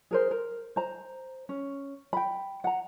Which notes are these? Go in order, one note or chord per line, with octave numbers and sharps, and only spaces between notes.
G#4 A#4 C5
A#4
C5 A#5
C#4
G5 B5
F#5 A#5